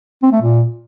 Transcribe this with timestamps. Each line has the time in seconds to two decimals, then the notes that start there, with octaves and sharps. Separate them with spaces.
0.22 C4
0.32 A3
0.42 A#2